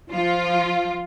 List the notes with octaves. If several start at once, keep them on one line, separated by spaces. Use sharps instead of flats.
F3 F4